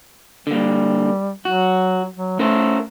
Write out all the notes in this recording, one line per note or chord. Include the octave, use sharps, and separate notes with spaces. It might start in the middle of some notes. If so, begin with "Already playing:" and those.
D3 G3 A#3
F#3 F#4
F#3
A3 C#4 A#4 C5